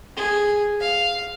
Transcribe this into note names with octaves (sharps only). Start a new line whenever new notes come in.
G#4
F5